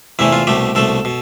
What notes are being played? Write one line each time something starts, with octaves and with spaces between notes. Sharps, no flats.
E2 C3 E3 A3 E4
F4
C2 B2 A3 G4
C2 B2 A3 A4
B2